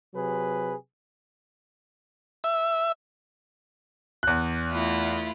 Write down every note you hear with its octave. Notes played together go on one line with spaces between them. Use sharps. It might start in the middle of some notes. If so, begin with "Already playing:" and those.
C3 F#3 G#4 B4
E5
E2 F#6
A3 E4 F4